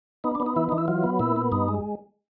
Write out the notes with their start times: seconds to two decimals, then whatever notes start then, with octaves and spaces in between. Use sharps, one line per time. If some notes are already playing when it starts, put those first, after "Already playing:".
0.24 B3 D#4
0.35 D4
0.40 B3
0.46 D#4
0.56 E3 E4
0.69 E3 D#4
0.78 E4
0.88 F#3 F4
1.04 B3
1.19 A#2 E4
1.36 B3
1.52 G2 D#4
1.68 G#3